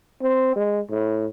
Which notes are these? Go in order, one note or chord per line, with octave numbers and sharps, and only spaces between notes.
C4
G#3
A2